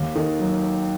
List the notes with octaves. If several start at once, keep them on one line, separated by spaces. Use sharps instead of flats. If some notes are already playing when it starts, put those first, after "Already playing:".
Already playing: D#2
D#3
F#3